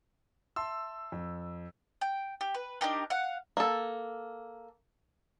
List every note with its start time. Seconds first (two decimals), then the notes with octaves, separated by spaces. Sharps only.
0.56 E5 A5 C6 E6
1.12 F2
2.01 G5
2.41 G4
2.55 B4
2.81 D4 D#4 G4 A#4
3.10 F5 F#5
3.57 A#3 A4